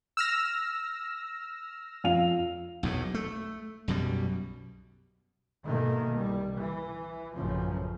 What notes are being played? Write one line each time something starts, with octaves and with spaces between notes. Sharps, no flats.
E6 F6 A#6
F2 F5 F7
B1 E2 A2
A3
B1 F#2 B2 G3
G#2 B2 D#3 A3 A#3
C2 G3
E3
A1 F#2 C#3 F3